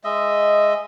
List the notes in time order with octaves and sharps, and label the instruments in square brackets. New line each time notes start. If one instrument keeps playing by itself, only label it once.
[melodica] G#3 D#5 E5